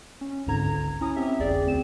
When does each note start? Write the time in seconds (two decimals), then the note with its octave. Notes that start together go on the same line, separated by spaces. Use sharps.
0.21 C#4
0.46 G#1 C#2 G#2 D3 A#5 G#6
1.01 C#4 E4 A#5 D#6
1.16 C4 C#4 G4 E5
1.39 G1 C2 F2 G#4 D5 G5
1.65 D2 C4 E7